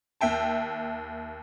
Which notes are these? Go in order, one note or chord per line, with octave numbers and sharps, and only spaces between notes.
D#2 E5 G5 A5